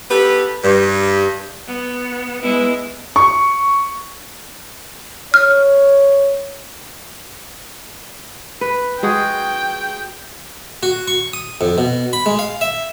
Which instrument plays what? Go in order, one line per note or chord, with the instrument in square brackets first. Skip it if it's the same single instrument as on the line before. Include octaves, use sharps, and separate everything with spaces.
[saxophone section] B3 G4 A4 B4
G2
[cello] B3
[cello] G#3 E4 [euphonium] B3
[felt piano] C#6
[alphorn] C#5 [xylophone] F6
[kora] B4
[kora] G#3 F#4 G#4 [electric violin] G5
[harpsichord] F#4
C#6
D#6
F2
B2
B5
G#3
F5
E5